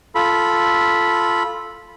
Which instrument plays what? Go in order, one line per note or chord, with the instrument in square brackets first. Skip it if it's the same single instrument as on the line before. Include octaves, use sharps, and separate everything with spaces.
[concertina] F4 A4 B5